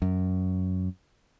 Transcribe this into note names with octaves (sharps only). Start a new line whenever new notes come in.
F#2